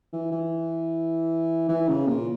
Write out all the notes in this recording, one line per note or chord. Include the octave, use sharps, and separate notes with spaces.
E3
E3
E3
C#3
A#2